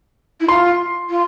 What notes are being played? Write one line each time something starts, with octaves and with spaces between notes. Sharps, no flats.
E4
F4 C6
F4